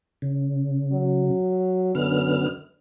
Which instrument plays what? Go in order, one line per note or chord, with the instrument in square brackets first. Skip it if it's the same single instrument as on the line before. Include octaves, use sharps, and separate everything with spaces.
[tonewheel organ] C#3
[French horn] F#3
[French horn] F#2 [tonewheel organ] D3 B3 F6